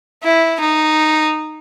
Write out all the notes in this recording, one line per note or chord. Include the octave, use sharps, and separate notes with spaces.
E4
D#4